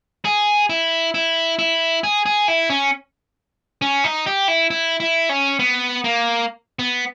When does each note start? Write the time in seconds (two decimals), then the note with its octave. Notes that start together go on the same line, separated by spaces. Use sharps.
0.25 G#4
0.70 E4
1.14 E4
1.59 E4
2.03 G#4
2.26 G#4
2.48 E4
2.70 C#4
3.82 C#4
4.04 D#4
4.26 G4
4.48 E4
4.71 E4
5.00 E4
5.29 C#4
5.59 B3
6.04 A#3
6.79 B3